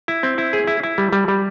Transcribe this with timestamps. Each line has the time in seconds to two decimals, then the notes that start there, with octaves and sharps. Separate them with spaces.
0.08 E4
0.23 C4
0.38 E4
0.53 G#4
0.67 E4
0.84 E4
0.98 G3
1.13 G3
1.28 G3